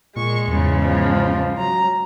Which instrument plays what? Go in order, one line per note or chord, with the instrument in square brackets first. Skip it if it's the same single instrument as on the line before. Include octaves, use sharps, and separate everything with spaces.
[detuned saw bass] A#2 [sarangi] G#3 [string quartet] C#6
[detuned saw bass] E2 [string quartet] G#2 C#3
[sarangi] F3
[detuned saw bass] F#3 [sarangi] A#5